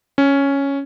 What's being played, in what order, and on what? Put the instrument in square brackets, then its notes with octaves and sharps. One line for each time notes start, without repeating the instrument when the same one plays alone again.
[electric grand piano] C#4